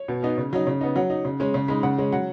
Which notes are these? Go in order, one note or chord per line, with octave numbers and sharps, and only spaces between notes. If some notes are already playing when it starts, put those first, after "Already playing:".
Already playing: C#5
B2
B3 D#4
C#3
F#3 D#4
C#3
B3 D#4
F#3 F#5
D#4
C#3
G#3 C#4
C#3
G#3 D#4 B5
C#3 F#5
G#3 C#4
F#3 F#5